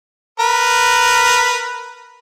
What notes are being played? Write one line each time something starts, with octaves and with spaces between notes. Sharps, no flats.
A#4 B4